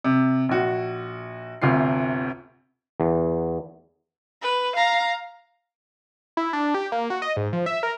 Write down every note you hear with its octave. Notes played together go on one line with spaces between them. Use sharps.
C3
A#1 F#4
G1 D2 C3 F4 C7
E2
B4
F5 A#5
E4
D4
G4
A#3
F#4
D#5
G#2
F3
E5
A#4